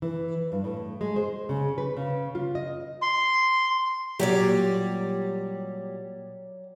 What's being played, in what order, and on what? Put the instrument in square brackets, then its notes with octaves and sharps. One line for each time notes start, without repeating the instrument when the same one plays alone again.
[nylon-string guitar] E3
G2
A2
G#3
C5
C#3
B4
C#3
F4
D#5
[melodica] C6
[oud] A#2 G3 G4 [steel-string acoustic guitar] F#3 C#5 D5